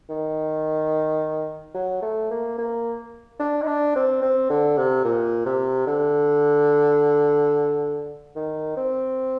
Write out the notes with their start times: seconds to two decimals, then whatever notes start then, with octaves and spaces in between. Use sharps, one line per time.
0.09 D#3
1.74 F#3
2.02 A3
2.31 A#3
2.58 A#3
3.39 D4
3.62 D#4
3.67 D4
3.96 C4
4.22 C4
4.50 D3
4.77 C3
5.04 A#2
5.46 C3
5.87 D3
8.36 D#3
8.77 C4